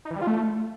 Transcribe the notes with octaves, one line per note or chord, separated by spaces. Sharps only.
D#4
E3
G3
F4
A3